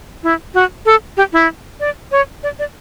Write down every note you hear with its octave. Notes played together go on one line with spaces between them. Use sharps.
E4
F#4
A4
G4
E4
D5
C#5
D5
D5